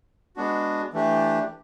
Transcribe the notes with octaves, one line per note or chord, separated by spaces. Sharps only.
G#3 B3 D4 F#4
E3 A3 D4 G4